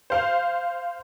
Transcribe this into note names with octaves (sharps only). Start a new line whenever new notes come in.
C5 F5